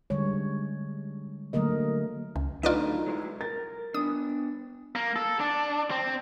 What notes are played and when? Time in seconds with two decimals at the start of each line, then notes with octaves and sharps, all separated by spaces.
0.10 D3 G3 G#3 C#5
1.53 D3 F#3 A3 A#3 A#4 D#5
2.36 C#2
2.63 D3 F#3 A3 D#4 F4 B4 D5 D#5
3.06 F#3 G#3 E4
3.41 A#4 A6
3.94 B3 D4 D#6
4.95 A#3
5.16 A4
5.40 D4
5.91 C4